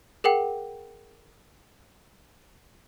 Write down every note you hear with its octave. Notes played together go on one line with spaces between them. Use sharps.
G#4 A#4 F#5 G5